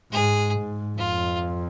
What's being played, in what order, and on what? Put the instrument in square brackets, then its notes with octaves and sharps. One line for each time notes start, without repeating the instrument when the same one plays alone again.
[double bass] G#2 [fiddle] G#4
[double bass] G#2
[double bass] F2 [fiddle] F4